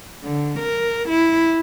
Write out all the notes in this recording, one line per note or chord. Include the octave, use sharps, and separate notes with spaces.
D3
A#4
E4